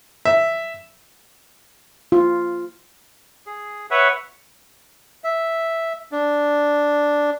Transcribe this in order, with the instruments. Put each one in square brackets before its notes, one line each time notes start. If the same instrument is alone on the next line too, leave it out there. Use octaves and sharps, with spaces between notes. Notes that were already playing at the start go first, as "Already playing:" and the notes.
[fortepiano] E5
[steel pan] F4
[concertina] G#4
B4 C#5 E5 F#5
[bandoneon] E5
D4